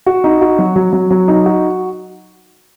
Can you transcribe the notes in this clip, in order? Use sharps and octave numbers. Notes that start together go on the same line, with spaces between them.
F#4
D#4
F#4
F#3
F#3
F#3
F#3
D#4
F#4